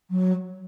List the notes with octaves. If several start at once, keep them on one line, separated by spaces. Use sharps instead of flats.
F#3